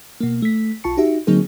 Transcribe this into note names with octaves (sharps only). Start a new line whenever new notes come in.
B2 A#3
A3 B6
B1 F4 A5 C#6 C#7
D#4 F#4 G4 E5
D3 F#3 A#3 C4 D#4 G#4